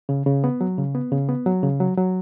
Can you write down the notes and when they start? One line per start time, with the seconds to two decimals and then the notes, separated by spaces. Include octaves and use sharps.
0.09 C#3
0.26 C#3
0.44 B3
0.61 F#3
0.78 C#3
0.95 B3
1.12 C#3
1.29 B3
1.46 F#3
1.63 C#3
1.80 F#3
1.97 F#3